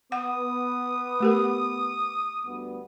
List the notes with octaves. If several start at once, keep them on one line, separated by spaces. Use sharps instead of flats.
B3 F#5 D#6
A3 G4 A#4
D2 G3 B3